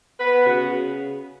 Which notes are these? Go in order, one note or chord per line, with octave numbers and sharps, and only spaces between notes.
B3 B4
C#3 F#4